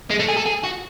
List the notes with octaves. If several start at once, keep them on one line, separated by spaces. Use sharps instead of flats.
G#3
A3
G#4
A4
G#4
F#4